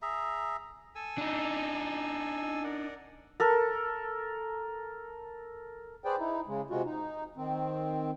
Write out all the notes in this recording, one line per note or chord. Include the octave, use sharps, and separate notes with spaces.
G#4 E5 A#5
A4 G#5 E6
D4 D#4
A#4 D5 F#5
A4 A#4
G#4 B4 C5 D5 G5
D#4 E4
C#3 G#3
C3 G#3 F4 F#4
D#4
D#3 C4